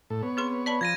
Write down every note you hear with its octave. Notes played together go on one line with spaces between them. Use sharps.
A2 A4
B3 C#5
C4 G#4 C6
D5 A5 B5
F3 G#6 A#6 D#7